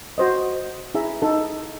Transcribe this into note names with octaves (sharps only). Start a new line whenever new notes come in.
F#4 C5 D#5
E4 G#4 E5 A#5
D#4 A4